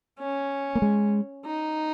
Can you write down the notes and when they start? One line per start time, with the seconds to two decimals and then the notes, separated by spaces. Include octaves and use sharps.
0.19 C#4
0.75 A#3
0.82 G#3
1.45 D#4